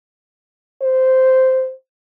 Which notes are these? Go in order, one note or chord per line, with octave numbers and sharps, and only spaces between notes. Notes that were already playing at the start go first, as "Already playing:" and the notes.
C5